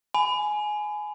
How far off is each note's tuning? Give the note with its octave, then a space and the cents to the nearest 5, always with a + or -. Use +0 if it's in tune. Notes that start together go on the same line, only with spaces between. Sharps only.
G#5 +15 B5 +25